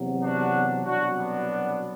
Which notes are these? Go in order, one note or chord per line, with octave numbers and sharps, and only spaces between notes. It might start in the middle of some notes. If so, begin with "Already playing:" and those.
Already playing: E2 C3 F#3
D4 F#4
C2 B2 F#3 D4 F#4
B3 D4